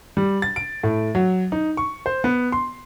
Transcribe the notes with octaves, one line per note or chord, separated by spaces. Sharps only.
G3
A6
D7
A2
F#3
D#4
C#6
C5
B3
C6